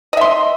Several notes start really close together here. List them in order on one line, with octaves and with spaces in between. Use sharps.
D#5 E5 C6